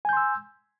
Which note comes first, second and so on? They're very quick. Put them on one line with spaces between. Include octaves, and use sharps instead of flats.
G#5 G6 C6 E6